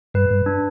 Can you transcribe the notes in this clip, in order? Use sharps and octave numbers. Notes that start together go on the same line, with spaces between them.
G2 B4
G2
D4